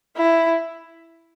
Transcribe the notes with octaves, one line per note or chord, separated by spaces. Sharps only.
E4